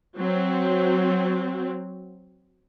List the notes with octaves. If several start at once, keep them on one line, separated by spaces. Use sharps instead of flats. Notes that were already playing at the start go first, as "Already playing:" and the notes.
F#3 C4